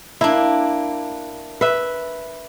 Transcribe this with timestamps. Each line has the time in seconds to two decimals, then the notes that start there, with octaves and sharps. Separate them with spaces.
0.21 A#3 D4 E4
1.61 B4 E5